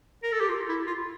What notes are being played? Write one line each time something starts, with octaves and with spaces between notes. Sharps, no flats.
A#4
A4
G4
F4
E4
F4